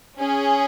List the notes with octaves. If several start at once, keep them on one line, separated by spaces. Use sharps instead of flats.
C#4 G#4